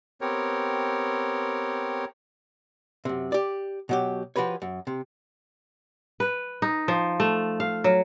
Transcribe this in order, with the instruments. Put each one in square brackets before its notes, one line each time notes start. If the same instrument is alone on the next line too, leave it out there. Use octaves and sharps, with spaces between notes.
[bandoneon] B3 C4 G4 A#4 C#5
[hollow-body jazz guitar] F#2 C3
G4 D5
B2 F#3 G4
F3 F#4 G4 B4 C#5
F#2
C3
[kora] B4
D#4
F3
A3
F5
F#3